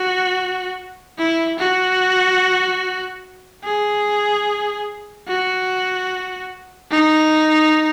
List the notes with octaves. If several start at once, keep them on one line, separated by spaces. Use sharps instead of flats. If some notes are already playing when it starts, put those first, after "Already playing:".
Already playing: F#4
E4
F#4
G#4
F#4
D#4